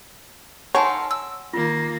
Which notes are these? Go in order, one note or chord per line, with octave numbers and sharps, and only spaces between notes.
D#4 A4 C#5 F5 F#5 G#5 C6
E6
D#3 A#3 F4